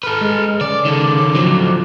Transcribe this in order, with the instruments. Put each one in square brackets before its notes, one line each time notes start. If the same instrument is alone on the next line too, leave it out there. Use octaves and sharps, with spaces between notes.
[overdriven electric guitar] A4 B4 [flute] F6
[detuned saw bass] G#3
[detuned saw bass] C#3 [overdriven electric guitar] D5 [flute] D6
[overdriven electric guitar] D#3 A4
[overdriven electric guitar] D3 F#3 [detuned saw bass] F3